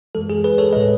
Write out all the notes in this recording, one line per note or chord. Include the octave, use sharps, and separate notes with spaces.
F#2 E3 G#3 A4
G#4
G#4 B4
A4 C#5
A2 G#3 B4 D#5